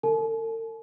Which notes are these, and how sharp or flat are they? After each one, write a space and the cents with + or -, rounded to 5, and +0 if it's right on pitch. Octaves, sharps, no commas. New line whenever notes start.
A4 +45 A5 -45